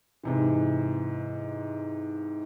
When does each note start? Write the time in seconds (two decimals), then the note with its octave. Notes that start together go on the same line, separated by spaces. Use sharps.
0.24 G#2 C3 E3